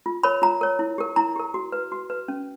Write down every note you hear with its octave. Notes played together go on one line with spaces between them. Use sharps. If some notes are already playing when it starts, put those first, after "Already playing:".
F4
A#4 C#5 B5
F4 A#5
A#4 C#5
E4
G4 A#4
E4 A#5
G4 A#4
F#4
B4
F#4
B4
C#4